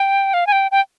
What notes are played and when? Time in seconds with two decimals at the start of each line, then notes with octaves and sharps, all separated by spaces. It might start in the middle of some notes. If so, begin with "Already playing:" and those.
Already playing: G5
0.34 F5
0.47 G#5
0.52 G5
0.71 G5